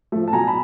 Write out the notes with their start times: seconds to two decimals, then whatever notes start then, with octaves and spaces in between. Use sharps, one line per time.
0.12 F3 A3
0.28 A5
0.33 B2 G#5 A#5
0.47 A5 B5